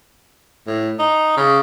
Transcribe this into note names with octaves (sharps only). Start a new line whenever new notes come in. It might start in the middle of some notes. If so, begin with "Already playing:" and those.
A2
D#4
C#3